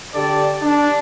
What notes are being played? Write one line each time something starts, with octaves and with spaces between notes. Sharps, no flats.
D3 G4 D5 A5
D4